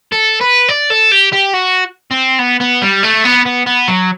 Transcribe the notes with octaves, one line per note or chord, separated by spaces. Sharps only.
A4
B4
D5
A4
G4
G4
F#4
C4
B3
B3
G3
A3
B3
B3
B3
F#3